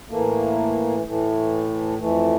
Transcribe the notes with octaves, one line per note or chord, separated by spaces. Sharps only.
A2 E3 A3 A#3
A2 E3 A3
F2 E3 A3